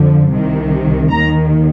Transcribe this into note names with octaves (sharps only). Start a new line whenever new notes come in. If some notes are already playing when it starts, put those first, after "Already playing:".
Already playing: F2 D3 F3
C2 C3 D#3
D#2 D#3 A#5